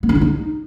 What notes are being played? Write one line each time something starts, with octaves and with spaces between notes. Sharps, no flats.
B3
C#4
E4
D#4